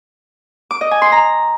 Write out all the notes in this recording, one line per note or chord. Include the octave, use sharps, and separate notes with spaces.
D6
D#5
G#5
C6
A#5